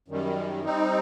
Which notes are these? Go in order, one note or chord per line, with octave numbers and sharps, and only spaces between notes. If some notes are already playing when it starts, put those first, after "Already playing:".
F#2 D#3 G3
G3 C4 D#4